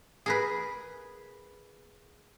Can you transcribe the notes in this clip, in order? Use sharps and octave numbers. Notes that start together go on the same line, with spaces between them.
G#4 A#4 B4